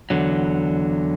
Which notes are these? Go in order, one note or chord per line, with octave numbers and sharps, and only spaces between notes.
E2 D3 F#3